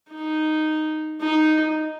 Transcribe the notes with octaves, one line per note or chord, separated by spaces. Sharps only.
D#4
D#4